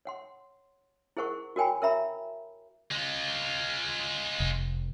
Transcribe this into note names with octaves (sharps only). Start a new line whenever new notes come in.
C#5 F#5 C6
E4 G#4 A#4 C5 F#5 C#6
F#4 A#4 C#5 G5 G#5 B5
A#4 C#5 E5 A#5 B5
G#3 F4
F1